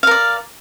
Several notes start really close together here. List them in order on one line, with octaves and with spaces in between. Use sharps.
F5 A#4 D5